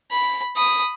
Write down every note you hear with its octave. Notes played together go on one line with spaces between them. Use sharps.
B5
B5 D#6